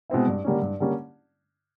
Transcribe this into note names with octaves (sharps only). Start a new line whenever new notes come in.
B2 G#3 C4 E4
G2
D3 G3 A#3 C#4
G2
D3 G3 A#3 C#4